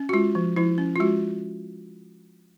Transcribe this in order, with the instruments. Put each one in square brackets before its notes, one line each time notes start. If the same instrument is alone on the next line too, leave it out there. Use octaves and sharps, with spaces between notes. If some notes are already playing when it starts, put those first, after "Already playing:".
Already playing: [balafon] C#4
F#4
G#3 F4
F3
F3 E4
C#4
F4
G#3 F#4